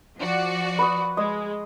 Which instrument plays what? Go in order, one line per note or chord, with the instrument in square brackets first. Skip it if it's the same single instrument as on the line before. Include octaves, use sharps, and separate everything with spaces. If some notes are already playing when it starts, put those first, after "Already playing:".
[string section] F3 F#4 D5
[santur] B4 C#6 D#6
[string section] G#3 [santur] D#5 C6 D#6